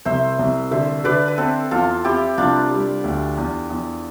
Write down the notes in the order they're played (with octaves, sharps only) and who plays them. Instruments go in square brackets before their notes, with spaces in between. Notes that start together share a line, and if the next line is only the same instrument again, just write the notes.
[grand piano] C2 [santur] C5 E5
[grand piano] C2
[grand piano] D3 [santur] C5 E5
[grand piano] D3 [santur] B4 D5
[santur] B4
[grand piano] C4 [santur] A4 C5
[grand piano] E2 [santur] F4 A4
[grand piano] C4 [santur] E4 G4
[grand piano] C2 [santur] D4 F4
[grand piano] G3
D2
E2
E2